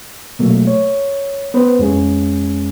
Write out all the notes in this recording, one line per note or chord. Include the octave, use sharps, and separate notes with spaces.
B2 F#3 A3 A#3
C#5
B3 B4 C5
F2 G#3 C#4 G#4